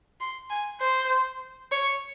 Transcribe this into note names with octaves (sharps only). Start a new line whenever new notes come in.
C6
G#5
C5
C#5